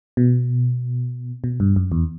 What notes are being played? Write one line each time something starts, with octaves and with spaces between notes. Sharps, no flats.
B2
B2
G2
F#2
E2